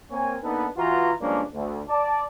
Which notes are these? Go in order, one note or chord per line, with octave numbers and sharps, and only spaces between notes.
A#3 C4 A#4 C#5 G#5
A#3 B3 D4 D#4 A4 B4
E3 F4 F#4 A#5
G2 F3 G#3 A#3 C#4 D4
D2
D5 A5